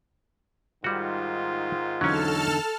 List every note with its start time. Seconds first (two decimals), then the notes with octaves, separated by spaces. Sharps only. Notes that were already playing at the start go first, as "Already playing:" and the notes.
0.84 G#2 D#3 G3 F4 F#4
2.01 E2 D3 F#3 C#4 D#4 A4 A5 F6